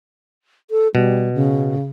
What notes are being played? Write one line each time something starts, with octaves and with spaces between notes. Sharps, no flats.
A4
B2 G3
C#3